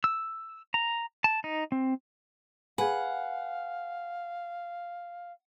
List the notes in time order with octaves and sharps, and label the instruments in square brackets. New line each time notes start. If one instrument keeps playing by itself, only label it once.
[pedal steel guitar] E6
A#5
A5
D#4
C4
[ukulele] G#4 B4 [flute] F5 [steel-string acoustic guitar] F#5 [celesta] G#5